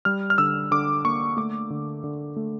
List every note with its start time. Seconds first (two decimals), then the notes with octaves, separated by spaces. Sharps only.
0.05 G3 F6
0.30 F6
0.38 D3 E6
0.71 D3 D6
1.05 A#3 C#6
1.37 A3 D6
1.70 D3
2.04 D3
2.36 A3